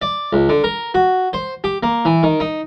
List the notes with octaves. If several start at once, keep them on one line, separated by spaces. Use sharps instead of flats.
D5
C#2
D3
A#4
F#4
C5
G4
A#3
E3
D#3
D#4